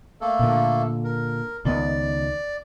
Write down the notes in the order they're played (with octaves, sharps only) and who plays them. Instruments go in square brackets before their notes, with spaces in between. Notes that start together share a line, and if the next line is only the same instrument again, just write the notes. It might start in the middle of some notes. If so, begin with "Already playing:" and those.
[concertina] A3 A#3 A4
[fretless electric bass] A#2 D3
[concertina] A#4
[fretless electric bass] C#2 D#3 B3 [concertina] D5